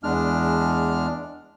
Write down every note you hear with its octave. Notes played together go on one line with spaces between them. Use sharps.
E2 G#3 D4 F6